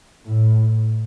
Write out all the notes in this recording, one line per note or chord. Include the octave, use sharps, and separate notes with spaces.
A2